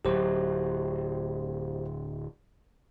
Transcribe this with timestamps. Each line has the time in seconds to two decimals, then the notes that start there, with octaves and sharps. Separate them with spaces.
0.05 D1 F#3 G4 C5